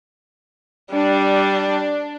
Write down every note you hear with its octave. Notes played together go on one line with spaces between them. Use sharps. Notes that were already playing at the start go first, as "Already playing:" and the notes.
G3 D4